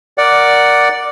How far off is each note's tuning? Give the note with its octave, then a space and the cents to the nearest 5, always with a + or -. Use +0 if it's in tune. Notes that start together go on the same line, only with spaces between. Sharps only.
A#4 +0 D5 +0 F#5 +0